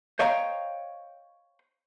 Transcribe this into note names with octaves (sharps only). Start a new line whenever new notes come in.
C5 C#5 D#5 F5 G5 A#5